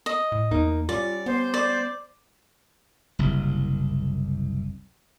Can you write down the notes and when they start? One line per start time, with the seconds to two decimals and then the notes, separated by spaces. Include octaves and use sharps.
0.06 D#5
0.32 A2
0.51 E2 A#3 D#4
0.89 G3 C#4 F4 D5
1.26 B3 C5
1.54 D5
3.19 F#1 C2